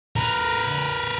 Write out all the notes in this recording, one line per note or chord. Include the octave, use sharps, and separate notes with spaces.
A#4 B4